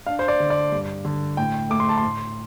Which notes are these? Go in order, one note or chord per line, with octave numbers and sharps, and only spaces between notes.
D4 F5
C5
D5
D3
D5
G2
D3
A2 G5
A3 D6
C6
A5
C6
A2